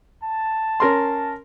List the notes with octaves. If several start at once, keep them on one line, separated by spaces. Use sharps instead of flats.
A5
C#4 A#4 C6